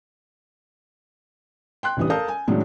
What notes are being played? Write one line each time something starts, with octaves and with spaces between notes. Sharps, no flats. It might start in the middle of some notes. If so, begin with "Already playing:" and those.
G5 C6 F#6
A1 G2 E3 G3 D#6
A4 A#4 F5 A5 D#6 G6
G#5
A2 D#3 F#3 G#3 C#4 D4